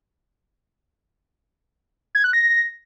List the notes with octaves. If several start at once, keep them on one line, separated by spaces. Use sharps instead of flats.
G#6
F#6
A#6